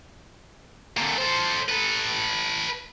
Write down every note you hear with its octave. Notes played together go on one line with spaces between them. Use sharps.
A#2 D3
A4 C5
A4 B4